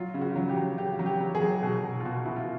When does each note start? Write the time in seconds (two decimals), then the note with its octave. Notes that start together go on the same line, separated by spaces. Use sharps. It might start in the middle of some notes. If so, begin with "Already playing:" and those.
Already playing: F#3 F4
0.14 C#3
0.21 F#4
0.36 F#3
0.49 G4
0.57 F#3
0.78 C#3 G4
0.99 F#3
1.06 G4
1.20 F#3
1.35 G#4
1.41 F#3
1.63 B2 G#4
1.84 B2
2.00 F4
2.05 B2 F#4
2.25 B2 E4
2.36 F4